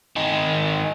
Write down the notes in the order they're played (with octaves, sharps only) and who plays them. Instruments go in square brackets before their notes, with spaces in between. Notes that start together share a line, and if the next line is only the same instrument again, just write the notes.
[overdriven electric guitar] D#3 G#3